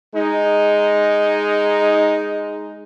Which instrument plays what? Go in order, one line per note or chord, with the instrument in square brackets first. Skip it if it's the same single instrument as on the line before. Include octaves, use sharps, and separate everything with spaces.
[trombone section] G#3 D#4